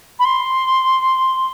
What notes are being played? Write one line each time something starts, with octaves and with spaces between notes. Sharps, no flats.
B5
C6